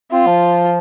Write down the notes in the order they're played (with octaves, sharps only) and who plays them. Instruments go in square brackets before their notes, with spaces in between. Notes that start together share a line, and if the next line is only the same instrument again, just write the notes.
[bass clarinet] C4 [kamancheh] F4
[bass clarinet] F3